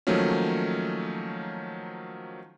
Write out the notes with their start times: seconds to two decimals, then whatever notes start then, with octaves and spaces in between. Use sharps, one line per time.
0.07 D#3 F3 F#3 A3 A#3 C#4